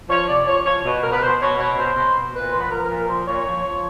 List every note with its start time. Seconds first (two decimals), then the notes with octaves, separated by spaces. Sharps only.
0.09 F3 C#5
0.27 C3 D5
0.46 F3 C#5
0.65 F3 C#5
0.84 B2
1.02 B2 A#4
1.12 B4
1.21 B2 C5
1.40 B2 C#5
1.58 B2 C#5
1.77 B2 C5
1.95 B2
2.15 B2
2.33 A#2 B4
2.50 F3 C5
2.60 B4
2.70 F3 A#4
2.83 A#4
2.90 A#2
2.96 A#4
3.08 F3 C5
3.27 A#2 C#5
3.46 F3
3.64 F3